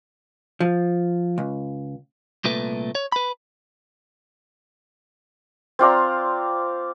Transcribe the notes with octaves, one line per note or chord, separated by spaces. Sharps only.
F3
C#2
C2 A#2 A3 B4
C#5
B4 B5
C4 F4 D5 A#5